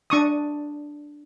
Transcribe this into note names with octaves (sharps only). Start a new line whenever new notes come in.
D4 C#6 D#6